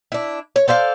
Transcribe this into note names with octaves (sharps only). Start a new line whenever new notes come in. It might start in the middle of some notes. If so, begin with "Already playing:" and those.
D4 E4
C#5
A4 C5 D5 F5